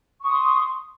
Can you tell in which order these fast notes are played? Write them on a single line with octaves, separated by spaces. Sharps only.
C#6 D#6 C6